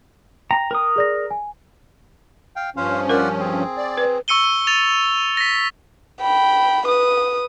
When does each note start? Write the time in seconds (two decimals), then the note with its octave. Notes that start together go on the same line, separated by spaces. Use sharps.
0.51 G5 A#5
0.71 A#4 D#6
0.96 G#4 D5 A#6
1.31 G#5
2.56 F5 G5
2.77 G2 F3 C#4 C5 F5
3.09 F4 A#4 D5 F#5
3.40 C4 G#4
3.77 D5
3.98 B4
4.28 C#6 E6 C#7 D#7 G7
4.67 A6 F7
5.37 A#6 B6
6.21 G5 B5
6.86 B4 D#6